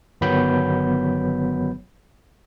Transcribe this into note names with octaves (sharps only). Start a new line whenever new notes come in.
G1 D#3 F#3 B3 B5 G6